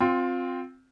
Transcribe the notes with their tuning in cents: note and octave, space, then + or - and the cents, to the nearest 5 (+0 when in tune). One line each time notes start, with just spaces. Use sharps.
C4 +0 F4 +20